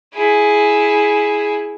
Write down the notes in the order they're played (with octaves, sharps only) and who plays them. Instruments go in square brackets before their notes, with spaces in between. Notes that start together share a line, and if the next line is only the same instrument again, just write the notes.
[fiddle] E4 G#4